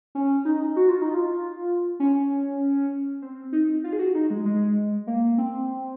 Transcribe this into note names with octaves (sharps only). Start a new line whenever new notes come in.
C#4
D#4
F#4
F4
D#4
F4
C#4
C4
D#4
F4
G#4
F#4
D#4
G#3
G#3
A#3
C4